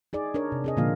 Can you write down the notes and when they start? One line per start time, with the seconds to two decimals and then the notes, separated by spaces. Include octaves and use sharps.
0.13 D#4 G#4 D5
0.34 D4 A#4 C#5
0.52 C3
0.64 C4 G#4 D#5
0.77 A#2 D3 F3 A#3 F4 F5